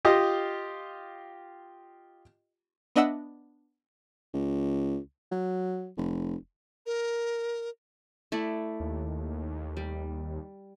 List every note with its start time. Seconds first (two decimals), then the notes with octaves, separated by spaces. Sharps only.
0.05 F4 G4 D#5
2.96 B3 D4 D#5 E5 F#5 E6
4.34 C#2
5.32 F#3
5.97 F1
6.86 A#4
8.32 A3 E4 D5
8.80 D#2
9.77 G3